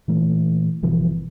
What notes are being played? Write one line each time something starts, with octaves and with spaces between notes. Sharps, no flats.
A#2 E3 A3
G1 B2 E3 F3